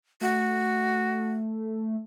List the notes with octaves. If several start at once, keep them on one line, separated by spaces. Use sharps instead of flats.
A3 F#4